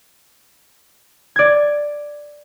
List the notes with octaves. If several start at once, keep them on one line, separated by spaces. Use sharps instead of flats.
D5 G#6